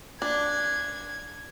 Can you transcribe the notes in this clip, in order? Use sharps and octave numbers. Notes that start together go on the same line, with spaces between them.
D4 G#6